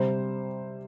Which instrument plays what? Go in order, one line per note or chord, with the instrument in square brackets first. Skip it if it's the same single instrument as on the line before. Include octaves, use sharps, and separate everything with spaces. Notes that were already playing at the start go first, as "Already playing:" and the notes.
Already playing: [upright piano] C3 G3 C5